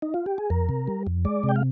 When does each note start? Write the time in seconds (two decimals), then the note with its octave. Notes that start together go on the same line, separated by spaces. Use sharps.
0.02 D#4
0.14 F4
0.26 G4
0.38 G#4
0.50 F2 A#4
0.69 C3
0.87 G3
1.07 F2
1.25 G#3 D5
1.43 C3
1.49 G5
1.56 F5